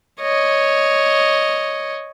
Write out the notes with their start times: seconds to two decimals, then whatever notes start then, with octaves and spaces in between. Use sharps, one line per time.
0.21 C#5 D#5